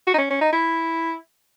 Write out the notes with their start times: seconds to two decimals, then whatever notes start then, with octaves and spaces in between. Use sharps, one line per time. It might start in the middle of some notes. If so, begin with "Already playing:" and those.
0.07 F#4
0.14 D#4
0.18 C#4
0.30 C#4
0.41 D#4
0.52 E4